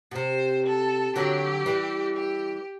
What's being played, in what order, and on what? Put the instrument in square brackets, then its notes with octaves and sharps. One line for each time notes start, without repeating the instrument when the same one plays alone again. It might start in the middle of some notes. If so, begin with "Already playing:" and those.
[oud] B2
[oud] C3 [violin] C5
[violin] A4
[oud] D3 F#3 [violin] G4
[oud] E3 G3
[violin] G4